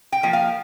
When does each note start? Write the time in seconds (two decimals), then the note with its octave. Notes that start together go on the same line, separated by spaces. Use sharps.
0.12 G5
0.23 F3 A#3
0.33 F5